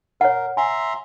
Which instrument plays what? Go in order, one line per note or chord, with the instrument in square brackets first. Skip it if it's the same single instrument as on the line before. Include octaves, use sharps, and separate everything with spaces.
[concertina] A#4 [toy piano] C#5 F#5
[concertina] E5 A#5 C6 [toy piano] G#5